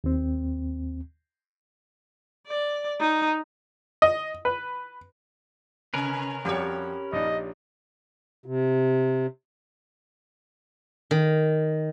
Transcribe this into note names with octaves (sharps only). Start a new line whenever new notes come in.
D#2 C4
D5
D#4
D#5
B4
C3 C#4 A#4 B4
F2 G3 F#4 G4 C#5
A#1 D4 D#4 D#5
C3
D#3